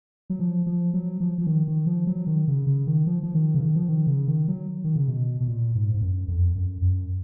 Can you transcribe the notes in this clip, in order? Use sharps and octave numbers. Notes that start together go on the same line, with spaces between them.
F#3
F3
F3
F#3
F3
F3
D#3
D#3
F3
F#3
D#3
C#3
C#3
D#3
F3
F3
D#3
C#3
D#3
F3
D#3
C#3
D#3
F#3
D#3
C#3
B2
B2
A#2
G#2
G#2
F#2
F2
F#2
F#2